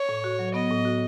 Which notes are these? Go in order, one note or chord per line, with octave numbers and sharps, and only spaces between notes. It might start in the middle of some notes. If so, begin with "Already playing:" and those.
Already playing: C#5
A2
F#4
F#3
B3 D#5
A2
F#4